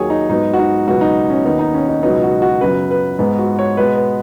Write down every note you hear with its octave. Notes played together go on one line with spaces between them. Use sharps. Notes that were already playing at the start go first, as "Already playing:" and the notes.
Already playing: D#2 D#3 F#3 G#4 C#5
D#4
G#2 F#3 B3 D#4
F#4
D#4
C#2 B2 F#3 B3 F#4
D#4
C#4
D#2 D#3 B3 D#4
D#4
C#4
D#4
C#2 B2 F#3 B3 D#4
F#4
F#4
F#2 C#3 F#3 B3 B4
B4
G#2 G#3 B3
F#4
C#5
B2 G#3 B3 B4
B4